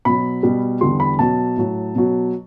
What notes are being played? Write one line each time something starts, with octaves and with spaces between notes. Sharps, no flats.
B2 F#3 B5
B2 G3
E2 D3 G3 C6
B5
B2 F#3 A5
A2 F#3
B2 F#3